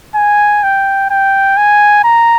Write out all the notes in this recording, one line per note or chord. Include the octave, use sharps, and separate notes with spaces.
G#5
G5
G5
G#5
A#5